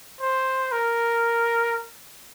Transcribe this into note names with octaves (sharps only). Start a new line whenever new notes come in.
C5
A#4